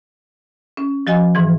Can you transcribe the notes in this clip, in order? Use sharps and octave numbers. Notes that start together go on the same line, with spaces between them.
C#4
F3 F#4 D#5 G#5
G#2 E3